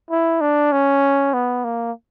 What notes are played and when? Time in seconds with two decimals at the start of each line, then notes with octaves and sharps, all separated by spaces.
0.10 E4
0.41 D4
0.72 C#4
1.33 B3
1.64 A#3